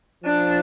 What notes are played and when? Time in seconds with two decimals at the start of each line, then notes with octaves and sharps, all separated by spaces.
0.23 F3 D4